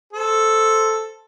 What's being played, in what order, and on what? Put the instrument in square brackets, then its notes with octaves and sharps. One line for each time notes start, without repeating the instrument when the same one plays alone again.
[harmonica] A4 C5